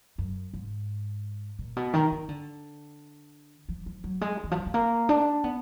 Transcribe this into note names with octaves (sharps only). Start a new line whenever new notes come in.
F#2
G#2
A#2
B2
D#3
D#3
D3
F3
F3
F#3
G#3
D#3
F3
F#3
G#3
A#3
D4
B3